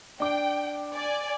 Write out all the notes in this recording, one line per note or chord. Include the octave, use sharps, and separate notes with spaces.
D4 G5 D6
D5 G#5